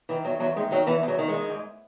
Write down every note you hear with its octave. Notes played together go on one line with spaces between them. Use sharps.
D#3 E3
E2 F#3
E2 F#3
D#3 G#3
D#3 F#3
E2 E3
E2 F#3
D#3
G#3
D#3
G#2